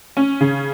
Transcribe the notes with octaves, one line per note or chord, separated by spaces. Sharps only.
C#4
C#3